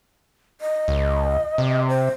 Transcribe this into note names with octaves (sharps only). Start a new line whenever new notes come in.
D#5
C#2
C3
C5